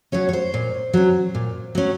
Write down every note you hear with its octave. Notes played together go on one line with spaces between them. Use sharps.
F#3 C#4 C#5
C#5
C5
A#2
F#3 C#4
A#2
F#3 C#4